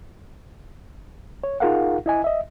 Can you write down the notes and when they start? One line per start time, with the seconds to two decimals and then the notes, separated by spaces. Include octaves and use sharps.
1.44 C#5
1.60 D#4 F4 G#4 A#4 F5 F#5
2.06 E4 D#5 G#5
2.24 D#5 E5